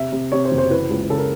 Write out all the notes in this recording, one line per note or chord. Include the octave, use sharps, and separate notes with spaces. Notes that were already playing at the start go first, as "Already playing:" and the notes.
Already playing: C3 E5
C3
C3 C#5
C5
F#1
C5
E3 B4
C#2
C#3 A4
A#4